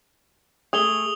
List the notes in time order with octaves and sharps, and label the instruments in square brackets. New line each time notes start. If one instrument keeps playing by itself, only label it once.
[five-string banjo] A3 G#4 [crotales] D#6 F7 G7